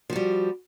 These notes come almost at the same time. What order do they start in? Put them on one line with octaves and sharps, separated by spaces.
F3 F#4 G3